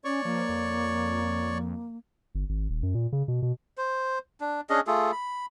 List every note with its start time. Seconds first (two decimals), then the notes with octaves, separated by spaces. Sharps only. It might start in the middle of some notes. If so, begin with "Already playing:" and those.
0.04 C#4 C#5 D5 C#6
0.25 F3 A#3
0.49 F2
2.35 G1
2.49 G#1
2.70 D#1
2.83 F#2
2.95 A#2
3.12 C#3
3.28 B2
3.42 B2
3.78 C5
4.41 D4
4.70 C#4 D4 G#4 D#5
4.87 A3 F4 G#4 A4
5.12 B5